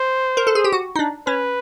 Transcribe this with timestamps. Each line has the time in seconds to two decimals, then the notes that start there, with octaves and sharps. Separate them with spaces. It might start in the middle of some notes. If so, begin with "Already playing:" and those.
Already playing: C5
0.37 A#4
0.47 A4
0.55 G#4
0.64 G4
0.72 F#4
0.96 D#4
0.99 D4
1.27 C#4 B4